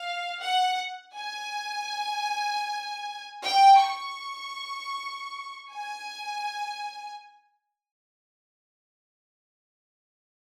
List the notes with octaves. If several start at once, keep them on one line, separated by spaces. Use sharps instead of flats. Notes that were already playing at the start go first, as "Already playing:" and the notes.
Already playing: F5
F#5
G#5
G5
C#6
G#5